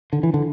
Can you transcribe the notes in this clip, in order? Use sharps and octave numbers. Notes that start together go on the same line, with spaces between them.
D3
E3
D3